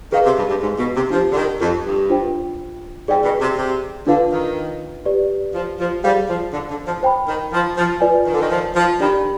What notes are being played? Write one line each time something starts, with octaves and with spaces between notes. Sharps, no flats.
D#3 G#4 B4 F5
C3
G2
G2
G#2
B2
C3
F3 D4 G4 C5
D3
D#3
F2
G2
D4 F4 C5 G5
G#2 G#4 D5 G5
B2
C3
C3
D3 D4 F4 B4 F5
D#3
G4 B4 D5
F3
F3
G3 G#4 C5 F5
F3
D3
D3
F3
C5 G5 B5
D#3
F3
F3
F4 B4 D5 G#5
D#3
D3
D#3
F3
F3
D#3 D4 G4 D5 G5 B5